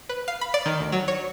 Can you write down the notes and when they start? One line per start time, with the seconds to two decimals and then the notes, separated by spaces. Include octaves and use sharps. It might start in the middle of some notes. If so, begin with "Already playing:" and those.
0.09 B4
0.28 F5
0.41 B5
0.54 D5
0.66 D#3
0.80 D2
0.92 F#3
1.08 C#5